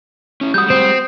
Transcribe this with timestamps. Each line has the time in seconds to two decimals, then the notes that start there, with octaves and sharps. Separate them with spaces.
0.41 C#4 E4
0.54 G3 G#3 F#4 D#6 G6
0.70 C4